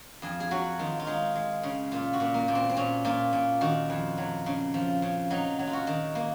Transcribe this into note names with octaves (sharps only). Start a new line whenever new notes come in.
F2 G#4
G#4
F#3 F#4
D#3 F4
F4
G#3 D#4
G#3
C#3
A#2 F4
F#4
A#2
A#3
A#2
C4
C4
A#2 C#4
A#2 F4
A#2
D#3 F#4
F2
F#3
C#3
F3
C#3
F#3 D#4
F#3
F4
F#4
D#3
A#3